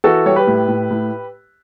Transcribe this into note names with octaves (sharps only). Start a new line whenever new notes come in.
E3 F#4 A4
G3 C#5
G4 B4
A2
A2
A2